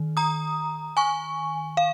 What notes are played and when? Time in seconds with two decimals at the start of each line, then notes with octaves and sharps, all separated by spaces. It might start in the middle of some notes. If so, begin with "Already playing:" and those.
Already playing: D#3
0.17 A#5 D#6
0.97 G#5 C#6
1.77 F5